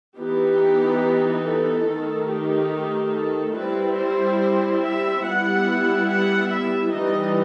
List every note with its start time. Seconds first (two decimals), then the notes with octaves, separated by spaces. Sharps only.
0.17 E3 B3 D#4 G4
1.44 A4
1.86 D#3 A3 D#4
2.29 G4
3.12 A4
3.55 G3 C4 E4 B4
3.97 C5
4.81 E5
5.24 G3 B3 E4 F#5
6.08 F#5
6.51 E5
6.92 E3 G3 D#4 D#5